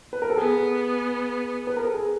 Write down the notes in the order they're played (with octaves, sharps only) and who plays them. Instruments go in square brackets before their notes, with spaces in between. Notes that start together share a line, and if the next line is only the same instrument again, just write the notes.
[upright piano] B4
A#4
A4
[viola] B3 [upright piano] G#4
[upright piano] B4
A#4
A4
G#4